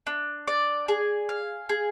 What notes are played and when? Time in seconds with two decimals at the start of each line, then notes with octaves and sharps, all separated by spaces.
0.07 D4
0.48 D5
0.88 G#4
1.29 F5
1.69 G#4